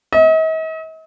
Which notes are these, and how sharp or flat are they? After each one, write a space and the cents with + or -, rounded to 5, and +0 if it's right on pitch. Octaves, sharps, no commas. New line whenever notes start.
D#5 +45